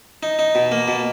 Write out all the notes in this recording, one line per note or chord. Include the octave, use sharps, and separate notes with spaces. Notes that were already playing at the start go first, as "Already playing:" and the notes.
D#4
D#4
B2
A#3
B2